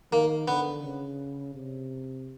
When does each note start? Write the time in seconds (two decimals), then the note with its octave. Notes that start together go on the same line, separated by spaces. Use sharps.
0.12 D#3 A#3
0.48 D3 B3
0.84 C#3
1.54 C3